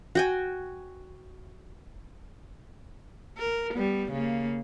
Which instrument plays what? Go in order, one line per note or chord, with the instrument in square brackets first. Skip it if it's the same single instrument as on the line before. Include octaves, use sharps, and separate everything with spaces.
[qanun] F#4 G5 G#5
[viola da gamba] A#4
G3 B3
C#3 A#3